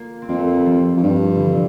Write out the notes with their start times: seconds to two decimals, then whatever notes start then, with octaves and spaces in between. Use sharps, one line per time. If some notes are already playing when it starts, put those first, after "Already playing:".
Already playing: A#3 F4
0.22 C4
0.29 F2 A#3
0.38 A3
0.48 A#3
0.57 G3
0.66 F3
0.97 F2
1.03 G2
1.36 D3 E3
1.52 C3